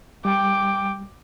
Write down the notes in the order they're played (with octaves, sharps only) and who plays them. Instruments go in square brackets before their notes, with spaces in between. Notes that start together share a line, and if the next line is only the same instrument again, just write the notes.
[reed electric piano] G3 [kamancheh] G5 D6